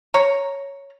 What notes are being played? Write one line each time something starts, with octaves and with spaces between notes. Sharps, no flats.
C#5 A#5